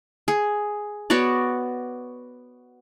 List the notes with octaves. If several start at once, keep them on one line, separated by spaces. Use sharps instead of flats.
G#4
B3 F#4 C#5 D5